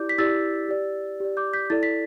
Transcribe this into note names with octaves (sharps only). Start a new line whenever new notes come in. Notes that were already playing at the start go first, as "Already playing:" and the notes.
Already playing: E4 G4 D5 D6 G6
B6
E4 G4 D5 E6 A6
G4 D5
G4 D5
D6 G6
G6 B6
E4 A4 D5 A6
B6